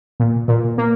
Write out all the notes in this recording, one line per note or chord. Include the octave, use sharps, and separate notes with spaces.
A#2
A#2
A#3